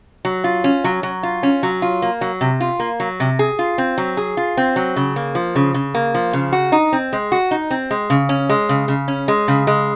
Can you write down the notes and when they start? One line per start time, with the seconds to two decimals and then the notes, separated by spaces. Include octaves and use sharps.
0.25 F#3
0.44 F4
0.64 C#4
0.84 F#3
1.03 F#3
1.23 F4
1.43 C#4
1.63 F#3
1.82 F4
2.02 A#3
2.21 F#3
2.41 C3
2.61 F4
2.80 A#3
3.00 F#3
3.20 C3
3.39 G#4
3.59 F4
3.78 C4
3.98 F#3
4.17 G#4
4.37 F4
4.57 C4
4.76 F#3
4.96 C#3
5.16 A#3
5.35 F3
5.55 C#3
5.74 C#3
5.95 A#3
6.14 F3
6.33 C#3
6.52 F#4
6.72 D#4
6.93 C4
7.13 G#3
7.32 F#4
7.51 D#4
7.71 C4
7.91 G#3
8.10 C#3
8.29 C#4
8.49 G#3
8.69 C#3
8.88 C#3
9.08 C#4
9.28 G#3
9.48 C#3
9.67 G#3